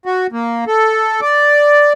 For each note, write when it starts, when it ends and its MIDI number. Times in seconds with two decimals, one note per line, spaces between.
0.06 0.27 66
0.32 0.64 58
0.67 1.21 69
1.21 1.93 74